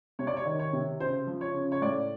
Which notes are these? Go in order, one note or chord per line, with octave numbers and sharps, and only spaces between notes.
C3 C#5
D5
C#5
D#3
C#5
C3
C#3 C5
F3
C#5
C#3
C#5
A2 D5